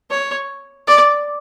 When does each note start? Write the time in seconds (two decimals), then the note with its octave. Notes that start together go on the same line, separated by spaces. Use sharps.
0.10 C#5
0.87 D5